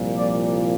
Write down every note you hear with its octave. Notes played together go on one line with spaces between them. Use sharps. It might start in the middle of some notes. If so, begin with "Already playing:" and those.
Already playing: C2 A#2 F3
D5